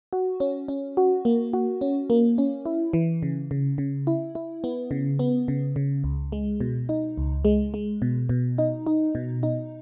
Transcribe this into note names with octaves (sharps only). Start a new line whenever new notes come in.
F#4
C#4
C#4
F#4
A#3
F#4
C#4
A#3
C#4
E4
E3
C#3
C#3
C#3
E4
E4
B3
C#3
B3
C#3
C#3
C#2
G#3
B2
D#4
C#2
G#3
G#3
B2
B2
D#4
D#4
B2
D#4